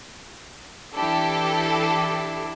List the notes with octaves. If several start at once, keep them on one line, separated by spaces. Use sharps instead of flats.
E3 D4 E4 G4 A4